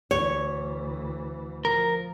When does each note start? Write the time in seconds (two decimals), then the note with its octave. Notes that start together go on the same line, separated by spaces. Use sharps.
0.11 D2 E3 C#5
1.65 F3 A#4